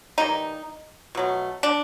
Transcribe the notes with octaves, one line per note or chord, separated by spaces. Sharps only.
E3 G3 A#3 D#4
B2 F#3 A3
D4